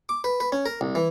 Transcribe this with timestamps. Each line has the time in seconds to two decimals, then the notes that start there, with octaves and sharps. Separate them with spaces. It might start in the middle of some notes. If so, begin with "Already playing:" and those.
0.09 D6
0.24 B4
0.40 B4
0.52 C#4
0.66 A#4
0.81 C2
0.95 E3